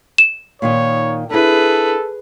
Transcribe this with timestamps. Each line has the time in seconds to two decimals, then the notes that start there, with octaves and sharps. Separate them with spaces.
0.18 E7
0.62 A#2 D#3 D#4 C#5
1.31 D4 E4 G#4 A4 B4